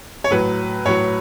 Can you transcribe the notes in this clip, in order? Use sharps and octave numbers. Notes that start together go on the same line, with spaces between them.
C#5
A2 F#3 B4
A2 F#3 C#5